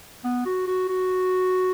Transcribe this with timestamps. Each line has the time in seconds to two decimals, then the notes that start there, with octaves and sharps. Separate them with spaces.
0.24 B3
0.45 F#4
0.67 F#4
0.88 F#4